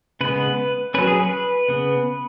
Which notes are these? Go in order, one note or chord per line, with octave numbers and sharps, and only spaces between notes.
C#3 G#3 B3 B4
F#3 C#4 B4
G#4
B4
C#3 B3